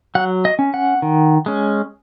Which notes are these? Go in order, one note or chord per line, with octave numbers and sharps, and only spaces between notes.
F#3 F#5
D#5
C#4
F#5
D#3
G#3 C#4